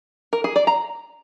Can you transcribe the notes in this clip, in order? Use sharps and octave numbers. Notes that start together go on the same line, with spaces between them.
A#4
G#4
D5
A#5